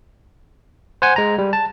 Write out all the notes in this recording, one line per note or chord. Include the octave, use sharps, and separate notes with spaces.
C5 F#5 G#5
G#3 A#5
G3
A5